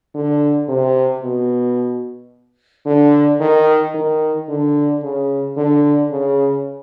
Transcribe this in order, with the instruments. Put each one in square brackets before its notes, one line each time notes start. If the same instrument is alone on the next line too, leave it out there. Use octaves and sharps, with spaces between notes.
[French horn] D3
C3
B2
D3
D#3
D#3
D3
C#3
D3
C#3